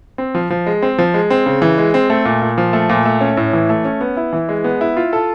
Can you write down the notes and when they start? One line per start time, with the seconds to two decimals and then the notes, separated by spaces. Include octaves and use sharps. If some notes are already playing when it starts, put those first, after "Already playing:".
0.18 C4
0.35 F3
0.50 F3
0.67 G#3
0.82 C4
0.98 F3
1.14 G#3
1.30 C4
1.46 C#3
1.62 E3
1.78 G#3
1.94 C4
2.10 A3
2.25 A#2
2.42 A#2
2.58 F3
2.73 A3
2.89 A#2
3.05 A3
3.21 C#4
3.37 A2
3.53 E3
3.69 A3
3.85 C#4
4.01 B3
4.17 E4
4.33 E3
4.49 G#3
4.64 B3
4.81 E4
4.97 F4
5.13 A4